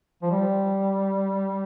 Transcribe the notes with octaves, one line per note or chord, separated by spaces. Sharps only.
F3
G3